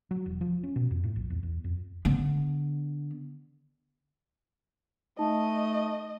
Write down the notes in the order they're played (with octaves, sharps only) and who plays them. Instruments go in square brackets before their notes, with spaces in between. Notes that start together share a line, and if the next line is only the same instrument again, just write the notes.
[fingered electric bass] F#3
E1
F3
C#4
B2
F2
A2
A#1
E2
E2
F2
[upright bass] D3 B3
[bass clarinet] A3 [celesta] D#4 A5 [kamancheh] D#5